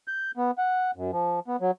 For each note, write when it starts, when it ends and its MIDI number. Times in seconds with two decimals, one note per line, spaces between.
0.08 0.31 91
0.37 0.51 59
0.58 0.91 78
0.96 1.11 42
1.12 1.40 53
1.48 1.56 59
1.61 1.71 54